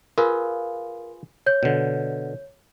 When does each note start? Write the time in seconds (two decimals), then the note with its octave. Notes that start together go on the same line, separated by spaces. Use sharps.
0.18 F4 G#4 A#4 B4 F5
1.46 C#5 G6
1.63 B2 D3